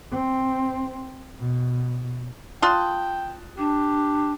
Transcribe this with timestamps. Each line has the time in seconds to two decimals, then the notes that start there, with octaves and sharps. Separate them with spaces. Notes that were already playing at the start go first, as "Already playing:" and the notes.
0.11 C4
1.39 B2
2.62 F4 G5 A5 C6 D#6 F#6
3.58 D4 G4